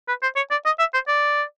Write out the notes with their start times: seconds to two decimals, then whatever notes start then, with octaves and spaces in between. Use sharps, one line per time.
0.08 B4
0.23 C5
0.36 C#5
0.51 D5
0.66 D#5
0.79 E5
0.94 C5
1.08 D5